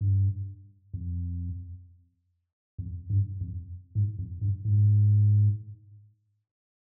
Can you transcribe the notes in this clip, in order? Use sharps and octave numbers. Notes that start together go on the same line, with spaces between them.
G2
F2
F2
G2
F2
G#2
F2
G2
G#2